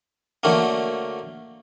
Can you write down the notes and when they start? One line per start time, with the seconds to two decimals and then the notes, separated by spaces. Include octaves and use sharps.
0.43 D3 F#3 A3 A#3